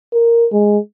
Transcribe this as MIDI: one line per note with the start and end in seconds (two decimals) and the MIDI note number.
0.13 0.47 70
0.53 0.78 56